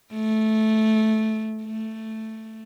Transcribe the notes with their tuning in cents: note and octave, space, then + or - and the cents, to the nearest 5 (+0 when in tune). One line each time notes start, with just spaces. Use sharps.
A3 -10
A3 +5